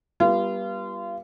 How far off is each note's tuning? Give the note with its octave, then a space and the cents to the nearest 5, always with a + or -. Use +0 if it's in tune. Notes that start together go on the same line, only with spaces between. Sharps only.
G3 +0 B3 -30 F4 -30